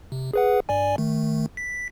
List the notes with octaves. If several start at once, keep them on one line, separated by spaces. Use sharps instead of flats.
C3
G#4 B4 F#5
G2 D5 G#5
D#3 A3
B6